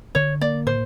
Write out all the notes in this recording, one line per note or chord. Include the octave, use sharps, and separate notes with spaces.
D3 C#5
A#3 D5
A2 C5